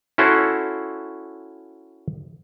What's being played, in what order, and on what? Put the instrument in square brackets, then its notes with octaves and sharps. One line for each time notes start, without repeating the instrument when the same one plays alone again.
[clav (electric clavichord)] C#4 E4 F#4 A4 C5